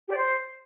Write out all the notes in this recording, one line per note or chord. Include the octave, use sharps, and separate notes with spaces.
G4
D5
C5